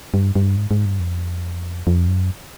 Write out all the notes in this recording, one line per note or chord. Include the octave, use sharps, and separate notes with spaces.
G2
G2
G#2
G#2
G2
F2
F2
F#2